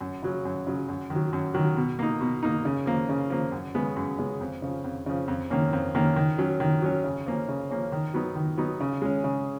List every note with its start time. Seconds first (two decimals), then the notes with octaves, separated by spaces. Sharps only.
0.01 F#2
0.23 C#3 F#3 C#4
0.45 F#2
0.67 C#3 F#3 C#4
0.89 F#2
1.10 D#3
1.15 F#3
1.33 F#2
1.54 D#3 F#3
1.77 B2
1.99 A#3 D#4
2.21 B2
2.43 A#3 D#4
2.65 C#3
2.86 F3 A#3
3.09 C#3
3.30 F3 A#3
3.52 F#2
3.75 C#3 G#3 B3
3.96 F#2
4.19 C#3 G#3 B3
4.41 F2
4.62 C#3 F3
4.84 F2
5.06 C#3 F3
5.28 F2
5.50 D#3 A#3 C#4
5.73 F2
5.95 D#3 A#3 C#4
6.16 D#3
6.38 F#3 C#4
6.60 D#3
6.82 F#3 C#4
7.04 C#3
7.26 F3 A#3 C#4
7.48 C#3
7.70 F3 A#3 C#4
7.92 D#3
8.14 F#3 B3 D#4
8.36 D#3
8.57 F#3 B3 D#4
8.80 C#3
9.02 G#3 C#4
9.24 C#3